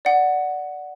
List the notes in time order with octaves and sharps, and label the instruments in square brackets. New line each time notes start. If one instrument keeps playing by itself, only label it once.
[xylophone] D5 F#5